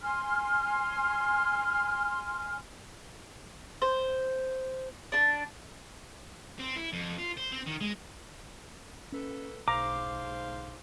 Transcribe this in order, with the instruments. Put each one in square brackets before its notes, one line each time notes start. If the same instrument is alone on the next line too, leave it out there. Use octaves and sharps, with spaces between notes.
[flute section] G#5 C6 F6
[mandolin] C5
D4 A5
[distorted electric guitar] C4
E4
F2
F4
C5
C4
D#3
G#3
[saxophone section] A#3 A4 B4 [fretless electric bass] C#4
[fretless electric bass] B1 [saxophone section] G#2 C5 F5 [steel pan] A#5 [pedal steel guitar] D6